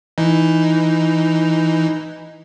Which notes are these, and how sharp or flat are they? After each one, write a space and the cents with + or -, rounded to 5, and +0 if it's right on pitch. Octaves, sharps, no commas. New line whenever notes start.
E3 +0 D#4 +0